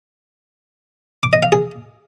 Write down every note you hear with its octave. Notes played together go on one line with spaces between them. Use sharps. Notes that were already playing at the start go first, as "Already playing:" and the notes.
D6
D#5
F5
G#4